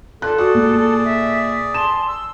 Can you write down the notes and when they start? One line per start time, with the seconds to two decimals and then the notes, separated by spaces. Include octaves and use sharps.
0.22 D4 F4 A4 F#6
0.38 F#4 G#4 D5
0.55 A#2
1.03 E5
1.74 A5 C6 E7
2.08 E6